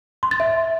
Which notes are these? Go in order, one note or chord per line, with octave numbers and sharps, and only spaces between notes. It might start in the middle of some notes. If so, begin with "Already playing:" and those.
C6
A6
E5